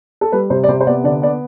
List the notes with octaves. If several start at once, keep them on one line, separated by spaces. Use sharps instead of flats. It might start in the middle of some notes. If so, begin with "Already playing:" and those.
A4
G3 B4
C3 C5
D5
C3 C5
C5
B3 D5
D3 D5
B3 D5